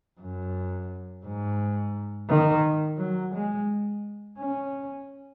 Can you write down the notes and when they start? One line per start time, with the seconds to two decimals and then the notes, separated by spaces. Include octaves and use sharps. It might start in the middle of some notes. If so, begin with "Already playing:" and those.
0.20 F#2
1.25 G#2
2.29 D#3
2.98 F#3
3.34 G#3
4.38 C#4